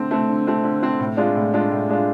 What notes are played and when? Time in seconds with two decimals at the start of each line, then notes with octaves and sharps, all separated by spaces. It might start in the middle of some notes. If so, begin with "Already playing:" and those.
Already playing: D3 A3 C4
0.11 A3 C4
0.29 D3
0.47 A3 C4
0.64 D3
0.82 A3 C4
1.00 A2
1.17 G#3 D4 F4
1.35 A2
1.54 G#3 D4 F4
1.71 A2
1.89 G#3 D4 F4